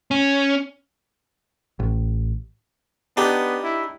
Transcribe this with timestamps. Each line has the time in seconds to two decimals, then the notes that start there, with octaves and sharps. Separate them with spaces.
0.11 C#4
1.80 A1
3.17 B3 D4 D#4 G4
3.64 E4